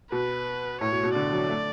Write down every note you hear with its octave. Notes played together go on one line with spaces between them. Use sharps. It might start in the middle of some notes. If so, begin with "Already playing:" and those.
B2 B4
A2 C#5
B2
B2
D3 D5
F#3
A3